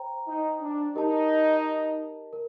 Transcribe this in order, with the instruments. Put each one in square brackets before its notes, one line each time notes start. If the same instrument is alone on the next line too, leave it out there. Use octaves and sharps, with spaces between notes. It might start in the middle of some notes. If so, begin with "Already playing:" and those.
Already playing: [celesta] C5 G5 A#5
[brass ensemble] D#4
D4
[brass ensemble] D#4 [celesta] G4 A#4 D#5 A5
[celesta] A#4